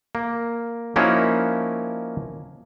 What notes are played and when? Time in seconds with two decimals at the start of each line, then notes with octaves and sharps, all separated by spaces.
0.15 A#3
0.96 F3 A#3 C#4 D#4 E4 F#4